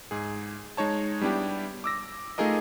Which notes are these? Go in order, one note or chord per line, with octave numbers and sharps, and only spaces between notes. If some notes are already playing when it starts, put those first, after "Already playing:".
G#2 G#4
G#3 D#4 C#5 A5
G3 B3 D4 E4 G4
D6 E6 A#6
A3 D#4 F4 G#4 A#4 D#5